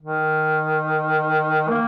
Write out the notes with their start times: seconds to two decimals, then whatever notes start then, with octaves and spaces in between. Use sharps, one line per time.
0.02 D#3
1.69 A#3